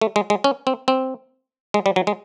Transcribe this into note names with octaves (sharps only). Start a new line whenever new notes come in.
A3
G#3
G#3
C#4
C4
C4
G#3
G3
F#3
G#3